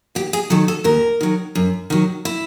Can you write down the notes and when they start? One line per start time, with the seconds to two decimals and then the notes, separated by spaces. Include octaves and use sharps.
0.15 D#2 G4
0.33 G#4
0.50 D#3 F#3 A4
0.68 A4
0.84 D#2 A#4
1.21 D#3 F#3
1.55 F#2
1.90 D#3 F#3
2.25 E4